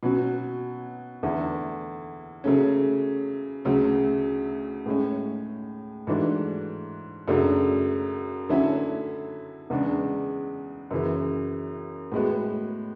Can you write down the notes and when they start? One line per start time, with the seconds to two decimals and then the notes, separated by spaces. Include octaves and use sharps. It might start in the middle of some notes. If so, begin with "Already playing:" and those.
0.03 B2 F#3 C#4 F#4
1.23 E2 D3 A3 E4
2.44 C#3 F#3 A3 C#4
3.65 D2 C#3 F#3
4.86 A2 G#3 C#4
6.07 G#2 E3 A3 D4 F#4
7.28 F#2 C#3 F#3 A3 D4
8.49 D3 F#3 A3 C#4 E4
9.70 E2 C#3 G#3 D4
10.91 F#2 C#3 E3
12.12 A2 G#3 B3 F#4